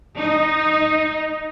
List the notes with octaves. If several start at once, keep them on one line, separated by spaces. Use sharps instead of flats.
D#4